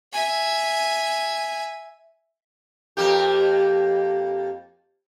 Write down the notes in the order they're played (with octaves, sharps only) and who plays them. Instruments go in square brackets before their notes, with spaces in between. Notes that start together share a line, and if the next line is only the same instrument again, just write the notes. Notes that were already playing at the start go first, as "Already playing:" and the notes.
[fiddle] E5 G#5
[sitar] F2 A#3 G4